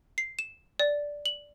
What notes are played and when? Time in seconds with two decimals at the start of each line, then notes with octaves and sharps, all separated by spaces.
0.18 C7
0.39 E7
0.80 D5
1.26 F#7